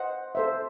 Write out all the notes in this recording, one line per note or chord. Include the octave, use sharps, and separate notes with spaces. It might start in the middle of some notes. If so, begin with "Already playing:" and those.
Already playing: C5 D#5 F#5
A4 C5 E5